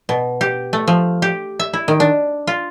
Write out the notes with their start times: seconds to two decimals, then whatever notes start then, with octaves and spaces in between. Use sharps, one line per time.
0.09 B2
0.41 G4
0.73 A3
0.88 F3
1.22 G4
1.60 E5
1.73 E4
1.88 D#3
2.00 D4
2.47 F4